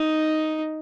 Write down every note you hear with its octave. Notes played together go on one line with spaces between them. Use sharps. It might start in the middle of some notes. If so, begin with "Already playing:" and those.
Already playing: D#4